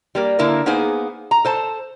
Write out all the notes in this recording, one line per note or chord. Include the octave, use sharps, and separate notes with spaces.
G3 A#3 A#4
D3 A#3 E4 A#4
A#3 B3 D#4 G#4 C5 G#5
A#5
A4 C5 A5